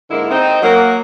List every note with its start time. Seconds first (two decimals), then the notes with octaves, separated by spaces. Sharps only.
0.10 G#2 D3 G#3 A#3 E4
0.31 C4 D#4
0.62 F#3 A#3